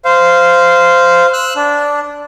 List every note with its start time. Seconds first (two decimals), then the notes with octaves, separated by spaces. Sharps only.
0.05 C5 F5
1.33 E6 F#6
1.56 D4